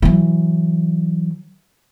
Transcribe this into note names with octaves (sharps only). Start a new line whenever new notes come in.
E3 F#3